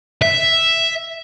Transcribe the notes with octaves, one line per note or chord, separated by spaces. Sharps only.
E5